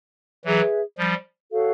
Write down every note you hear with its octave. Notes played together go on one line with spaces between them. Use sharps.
E3 F#3 G#4 B4 E5
F3 G3
F#4 A4 C#5 F5